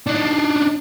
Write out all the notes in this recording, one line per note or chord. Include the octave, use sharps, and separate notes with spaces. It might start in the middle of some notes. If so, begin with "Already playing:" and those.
D4 D#4